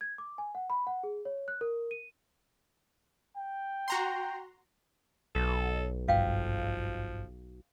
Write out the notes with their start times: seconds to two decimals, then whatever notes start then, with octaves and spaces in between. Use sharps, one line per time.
0.01 G#6
0.18 D6
0.38 G#5
0.55 F#5
0.70 B5
0.87 F#5
1.03 G#4
1.25 C#5
1.48 F#6
1.61 A#4
1.91 D#7
3.37 G5
3.88 F#4 A#5 C6
5.35 B1 A4
6.08 G#1 G2 F3 F5 G5